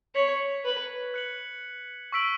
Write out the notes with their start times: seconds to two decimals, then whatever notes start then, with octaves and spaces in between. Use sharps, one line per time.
0.15 C#5 G#6 B6 F#7
0.65 B4
1.14 F#6 C#7 F#7
2.12 C#6 E6 B6 D7 F#7